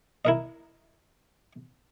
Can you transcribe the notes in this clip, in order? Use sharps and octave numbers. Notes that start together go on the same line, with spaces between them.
E4 A#4 D#5